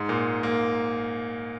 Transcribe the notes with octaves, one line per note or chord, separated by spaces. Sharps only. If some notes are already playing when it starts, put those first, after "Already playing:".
Already playing: G#2
A#2
A#3